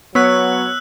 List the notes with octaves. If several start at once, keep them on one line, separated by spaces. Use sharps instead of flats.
F#3 B3 C#5 C#6 E6 F#6 B6